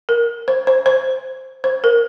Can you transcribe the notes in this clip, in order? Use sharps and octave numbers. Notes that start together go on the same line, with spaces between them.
A#4
C5
C5
C5
C5
A#4